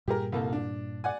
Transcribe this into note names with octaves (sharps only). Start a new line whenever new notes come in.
G2 A#2 G3 G4 G#4 A#4
C2 A#3 A4
D4
D5 F#5 G#5